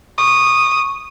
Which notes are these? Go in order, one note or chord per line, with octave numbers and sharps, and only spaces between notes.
C#6 D#6